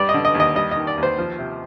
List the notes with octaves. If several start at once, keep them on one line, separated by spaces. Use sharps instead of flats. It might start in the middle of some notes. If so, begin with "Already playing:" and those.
Already playing: G2 G3 D5
D#5
D3
D#5
D#2
D#5
G3 D#5
D#3 D#5
D5
D#2
C5
F3
C3